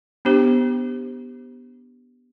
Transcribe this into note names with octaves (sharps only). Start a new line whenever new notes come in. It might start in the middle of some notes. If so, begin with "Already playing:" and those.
B3 D4 G4 C5